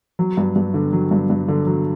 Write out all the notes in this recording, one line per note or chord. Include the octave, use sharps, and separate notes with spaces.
F#3
G2
G2
D3
F#3
G2
G2
D3
F#3